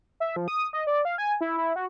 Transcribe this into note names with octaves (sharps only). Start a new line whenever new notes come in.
E5
F3
D#6
D#5
D5
F5
G#5
E4
E4
F#4